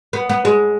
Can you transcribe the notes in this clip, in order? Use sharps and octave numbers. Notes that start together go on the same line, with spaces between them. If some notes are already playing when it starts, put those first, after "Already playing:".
B3
B3
G#3